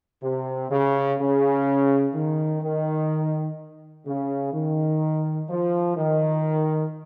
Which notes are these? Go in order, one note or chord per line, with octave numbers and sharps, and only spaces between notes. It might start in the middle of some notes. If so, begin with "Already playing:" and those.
C3
C#3
C#3
D#3
D#3
C#3
D#3
F3
D#3